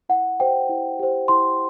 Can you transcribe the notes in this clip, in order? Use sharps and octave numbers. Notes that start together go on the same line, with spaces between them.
E4 F#5
G4 C5 G5
E4
G4 C5
E4 C6